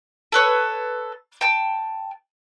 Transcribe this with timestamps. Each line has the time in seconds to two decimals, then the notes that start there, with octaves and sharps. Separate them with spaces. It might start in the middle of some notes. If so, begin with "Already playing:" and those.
0.32 A4 B4 C#5
1.41 G5 A5